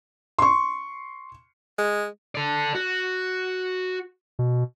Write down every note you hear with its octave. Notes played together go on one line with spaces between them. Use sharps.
C6 C#6
G#3
A4 D5
F#4
B2